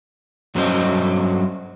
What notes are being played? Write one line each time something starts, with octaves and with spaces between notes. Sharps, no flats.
G2 F#3 G3 C#4 C5 D#5